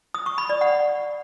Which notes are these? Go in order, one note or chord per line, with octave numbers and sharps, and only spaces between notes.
D#6
C#6
B5
D5
F#5